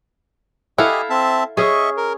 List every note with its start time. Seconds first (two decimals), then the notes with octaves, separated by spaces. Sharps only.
0.78 E4 G4 A4 D#5 F5 F#5 G#5
1.10 C4 E5 A5
1.57 C#4 G#4 D#5 E5 C#6
1.97 A#4